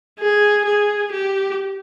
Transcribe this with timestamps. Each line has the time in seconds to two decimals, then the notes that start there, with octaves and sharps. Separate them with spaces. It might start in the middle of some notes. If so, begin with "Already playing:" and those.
0.19 G#4
0.65 G#4
1.12 G4